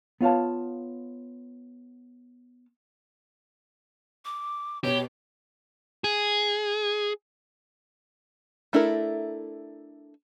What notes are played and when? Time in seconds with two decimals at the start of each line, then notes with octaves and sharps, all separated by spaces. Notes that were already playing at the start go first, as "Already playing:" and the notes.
0.21 B3 F4 C#5 F5 A5
4.25 D6
4.84 B2 G4 C#5
6.04 G#4
8.73 A3 D4 E4 A4 A#4